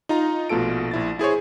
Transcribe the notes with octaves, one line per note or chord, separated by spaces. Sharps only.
D#4 F4 A#5
A#1 B2 A3 F4 A4 D7
A#1 E4 A6
E4 G#4 C5 C#5